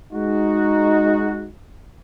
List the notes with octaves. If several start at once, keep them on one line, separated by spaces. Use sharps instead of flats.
G#3 D#4 F#4